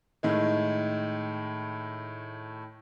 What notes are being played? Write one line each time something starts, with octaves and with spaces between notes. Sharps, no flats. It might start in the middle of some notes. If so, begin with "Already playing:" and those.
A2 D#3 G#3